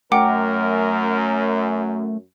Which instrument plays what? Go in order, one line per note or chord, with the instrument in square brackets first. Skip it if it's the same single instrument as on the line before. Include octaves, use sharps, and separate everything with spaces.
[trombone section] F#2 [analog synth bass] A3 [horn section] A#4 [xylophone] F#5 G5 D6